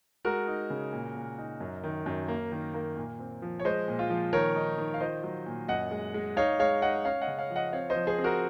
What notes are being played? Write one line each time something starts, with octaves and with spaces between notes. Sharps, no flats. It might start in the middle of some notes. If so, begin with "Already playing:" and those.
G#3 F#4 A#4
D#4
C#3
A#2
A#2
D#4
F#2
D#3
F#2
A#3
D#3
A#3
A#2
C4
F3
C#5
G#3 C5 D#5
A#2
F4
F3
D#3 A#4 C#5
D#4
D#3
F5
F4 C5 D#5
F#3
A#2
F#2 D#5 F#5
G#3
G#3
D#4 C#5 F5
G#3 C#5 F5
D#4 D#5 F#5
C#4 C#5 F5
D#5 F#5
C#3
C#5 F5
F3
D#5 F#5
C4 C#5 F5
C5 D#5
F3
G#4 C5
C4
F#4 A#4